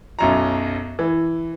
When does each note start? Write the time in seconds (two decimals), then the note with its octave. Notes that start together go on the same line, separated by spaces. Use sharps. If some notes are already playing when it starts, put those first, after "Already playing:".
0.19 B1 F#2 A#5
0.99 E3